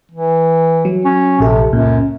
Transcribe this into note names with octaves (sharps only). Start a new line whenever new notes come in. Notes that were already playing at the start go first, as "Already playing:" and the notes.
E3
F#3
C#4
A#1 C3 A4
C#2 F#2 A#2